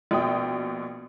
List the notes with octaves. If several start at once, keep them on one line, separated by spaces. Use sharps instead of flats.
A#1 B2 G5 D#6